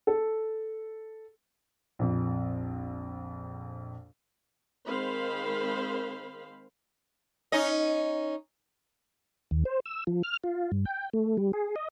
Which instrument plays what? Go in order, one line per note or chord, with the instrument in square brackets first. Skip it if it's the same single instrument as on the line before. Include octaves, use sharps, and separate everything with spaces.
[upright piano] A4
A#1 F2
[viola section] D#3 G#3 C4 C5 F5 B5
[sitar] C#4 D#4 D#5
[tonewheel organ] D#2
C5
E6
F3
F6
F4
G2
G5
A3
G3
G#4
D#5